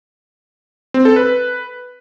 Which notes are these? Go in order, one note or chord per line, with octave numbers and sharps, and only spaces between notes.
C4
A4
B4